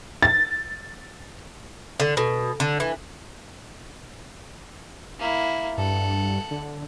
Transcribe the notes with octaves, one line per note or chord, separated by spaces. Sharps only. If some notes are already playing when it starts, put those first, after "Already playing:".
A6
D3
B2
D3
E3
A#3 E4
G2 A4 F#5
D3